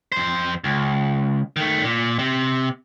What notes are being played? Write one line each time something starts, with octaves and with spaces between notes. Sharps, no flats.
F2 C5
C#2
D#3 A3
A#2
C3